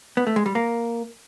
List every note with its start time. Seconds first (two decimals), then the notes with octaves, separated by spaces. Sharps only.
0.17 B3
0.27 A3
0.36 G#3
0.46 G3
0.55 A#3